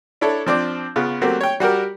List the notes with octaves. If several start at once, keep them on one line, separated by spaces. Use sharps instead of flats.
D4 E4 A4 C#5
F3 C4 D4 D6
C#3 B3 F4
F#3 A3 A#3 C4 F#4 G4
C#5 G5
G3 F#4 G4 A#4